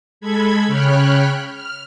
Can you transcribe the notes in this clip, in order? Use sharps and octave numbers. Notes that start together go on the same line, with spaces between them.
G#3 A4 B5 G#6
C#3 C#5 G5 B5 F6 F#6
F6